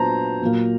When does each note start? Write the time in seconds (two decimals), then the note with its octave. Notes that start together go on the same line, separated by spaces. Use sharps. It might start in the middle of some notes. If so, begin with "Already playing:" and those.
Already playing: A#2 F#3 B3 D4 C5 A5 A#5
0.41 A#2 F#3 A#3